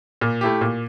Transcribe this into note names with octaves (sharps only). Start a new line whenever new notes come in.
A#2
A3 E4 G4
A#2